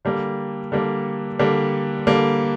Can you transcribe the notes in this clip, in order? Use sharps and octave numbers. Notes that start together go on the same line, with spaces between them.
D3 G3 A#3
D3 G3 A#3
D3 G3 A#3
D3 G3 A#3